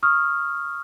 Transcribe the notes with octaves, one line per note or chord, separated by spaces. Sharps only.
C#6 D#6 F6